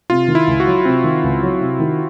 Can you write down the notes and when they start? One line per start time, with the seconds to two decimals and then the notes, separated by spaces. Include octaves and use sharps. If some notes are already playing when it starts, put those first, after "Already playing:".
0.10 C3 F4
0.28 D#3
0.35 E4
0.47 C#2
0.60 F#4
0.67 F#3
0.85 C3 C4
1.04 D#3
1.24 C#2
1.43 F#3
1.61 C3
1.80 D#3